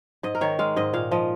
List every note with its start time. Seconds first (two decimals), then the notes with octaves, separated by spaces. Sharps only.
0.23 G#2 D#5
0.35 A#4
0.41 D#3 C#5
0.59 G#3 F5
0.76 G#2 D#5
0.93 A#2 F5
1.11 F3 D#5